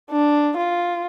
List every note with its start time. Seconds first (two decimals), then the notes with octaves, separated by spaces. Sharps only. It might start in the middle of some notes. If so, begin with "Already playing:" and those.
0.11 D4
0.57 F4